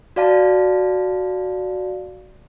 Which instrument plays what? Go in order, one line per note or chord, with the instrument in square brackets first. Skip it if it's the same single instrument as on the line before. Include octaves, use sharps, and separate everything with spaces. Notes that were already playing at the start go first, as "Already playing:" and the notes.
[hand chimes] F#4 D5 F5 A5